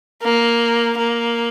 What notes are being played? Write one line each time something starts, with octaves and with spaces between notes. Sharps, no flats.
A#3
A#3